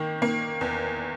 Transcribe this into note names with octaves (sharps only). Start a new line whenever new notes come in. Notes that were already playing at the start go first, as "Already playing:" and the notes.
Already playing: D#3 A#3
A#3
E2